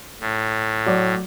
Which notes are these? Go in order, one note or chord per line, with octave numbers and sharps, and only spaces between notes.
A2
F#3 C#5 D5